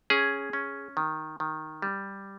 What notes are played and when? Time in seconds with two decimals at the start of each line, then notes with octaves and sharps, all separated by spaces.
0.10 C#4 G#4
0.53 C#4
0.97 D#3
1.40 D#3
1.82 G3